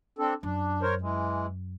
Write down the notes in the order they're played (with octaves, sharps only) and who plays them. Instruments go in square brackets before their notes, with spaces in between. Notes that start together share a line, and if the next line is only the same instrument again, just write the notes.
[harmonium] C4 D4 A4
[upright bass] F#2 [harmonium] D4
[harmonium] A#4 C5 C#5
E3 G#3